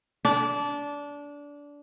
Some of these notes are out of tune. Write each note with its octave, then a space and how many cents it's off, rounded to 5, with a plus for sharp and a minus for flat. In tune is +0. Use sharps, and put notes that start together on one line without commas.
D4 -20